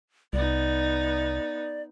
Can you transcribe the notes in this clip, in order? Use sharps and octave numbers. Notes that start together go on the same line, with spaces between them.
C2 B3 D#4 D5